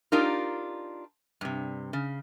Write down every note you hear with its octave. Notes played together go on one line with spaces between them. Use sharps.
D4 D#4 F4 G4 A#4
G2 C3
C#3